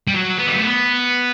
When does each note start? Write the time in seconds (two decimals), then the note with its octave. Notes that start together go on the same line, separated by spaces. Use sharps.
0.07 G3
0.14 F#3
0.38 B3
0.47 G3
0.56 A3
0.63 B3